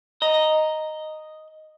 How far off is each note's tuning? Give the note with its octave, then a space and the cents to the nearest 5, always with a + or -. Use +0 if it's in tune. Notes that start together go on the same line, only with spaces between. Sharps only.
D#5 +0 A#5 +0